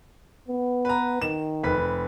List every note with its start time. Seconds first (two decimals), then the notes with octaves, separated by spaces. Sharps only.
0.48 B3
0.85 B4 A#5
1.22 D#3 E7
1.63 F1 B4 B6